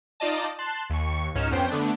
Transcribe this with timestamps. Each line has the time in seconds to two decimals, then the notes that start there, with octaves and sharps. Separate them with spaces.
0.20 D#4 F4 D5 D#5 A5
0.58 A5 C6 F#6
0.90 D#2 C#6
1.35 C#2 G#2 C#4 D#4 F6 E7
1.51 F2 B3 C#4 C5 G5
1.69 D3 A3 B3 D4